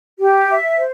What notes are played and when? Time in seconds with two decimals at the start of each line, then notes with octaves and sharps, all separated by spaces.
0.20 G4
0.49 E5
0.77 C5